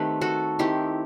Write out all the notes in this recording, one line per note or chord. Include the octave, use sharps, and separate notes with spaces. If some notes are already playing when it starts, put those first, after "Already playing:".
Already playing: D#3 A3 C4 G4 B4
F#4 A4
D#3 A3 C4 E4 G4